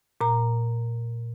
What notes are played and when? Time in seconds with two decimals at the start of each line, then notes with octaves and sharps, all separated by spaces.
0.21 A#2 A#5